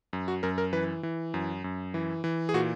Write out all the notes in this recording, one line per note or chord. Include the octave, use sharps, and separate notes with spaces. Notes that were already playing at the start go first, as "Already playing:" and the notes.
F#2
F#4
F#2 A#4
A#4
E3 B4
E3
F#2
F#2
E3
E3
G#4
A#2 F#4